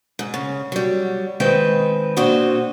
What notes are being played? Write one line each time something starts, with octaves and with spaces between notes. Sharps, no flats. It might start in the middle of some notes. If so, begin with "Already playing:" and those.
G#2
C#3
F#3 G3
D#3 G#3 C4 B4 G5
A#2 C4 D4 F#4 D#5